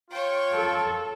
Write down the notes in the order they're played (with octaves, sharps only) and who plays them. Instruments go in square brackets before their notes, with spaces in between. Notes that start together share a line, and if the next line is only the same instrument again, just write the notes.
[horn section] F4 [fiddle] C#5 G5
[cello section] A4